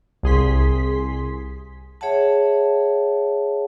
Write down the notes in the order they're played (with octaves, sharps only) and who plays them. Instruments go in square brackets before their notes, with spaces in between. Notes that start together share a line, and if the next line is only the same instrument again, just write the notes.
[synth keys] C2 G#4 C6 B6
[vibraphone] G#4 C#5 E5 F#5 A5